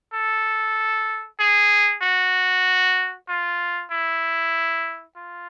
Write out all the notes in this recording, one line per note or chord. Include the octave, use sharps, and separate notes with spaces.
A4
G#4
F#4
F4
E4
F4